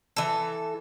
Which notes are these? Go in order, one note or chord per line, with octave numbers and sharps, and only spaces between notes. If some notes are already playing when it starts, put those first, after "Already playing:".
E3 A4